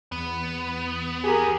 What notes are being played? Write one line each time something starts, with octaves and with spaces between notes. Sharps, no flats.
E2 B3
G4 G#4 A#4